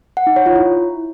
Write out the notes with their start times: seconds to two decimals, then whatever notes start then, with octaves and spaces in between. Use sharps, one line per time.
0.17 F#5
0.27 D#4
0.36 C#5
0.46 F4
0.56 E4